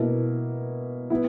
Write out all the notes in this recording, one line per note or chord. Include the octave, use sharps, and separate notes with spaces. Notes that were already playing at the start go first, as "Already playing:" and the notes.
Already playing: B2 A#3 E4
B3 E4